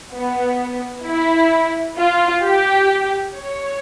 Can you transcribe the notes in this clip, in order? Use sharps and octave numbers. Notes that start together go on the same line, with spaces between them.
B3
E4
F4
G4
C#5